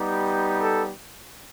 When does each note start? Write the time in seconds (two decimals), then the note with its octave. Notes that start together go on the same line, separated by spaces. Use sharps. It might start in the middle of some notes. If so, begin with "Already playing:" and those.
Already playing: G3 B3 D#4 G4
0.60 A4